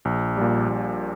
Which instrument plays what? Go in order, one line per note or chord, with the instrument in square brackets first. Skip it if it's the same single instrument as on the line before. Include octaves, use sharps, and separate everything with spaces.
[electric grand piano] A#1
A#2 G3
A#1